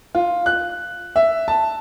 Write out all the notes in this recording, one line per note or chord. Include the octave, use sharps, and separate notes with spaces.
F4
F#6
E5
A5